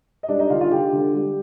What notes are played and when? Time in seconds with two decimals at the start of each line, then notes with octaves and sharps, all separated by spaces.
0.23 D#5
0.28 G3 D4 D5
0.39 D#4 D#5
0.50 D3 F4 F5
0.60 F4 F5
0.71 D3 G4 G5
0.93 D3
1.14 G3